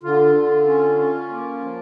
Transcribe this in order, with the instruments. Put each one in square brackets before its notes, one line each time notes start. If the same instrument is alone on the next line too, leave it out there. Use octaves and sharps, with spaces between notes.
[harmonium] D3 F4
D3
C#4
C#4
A#3
F3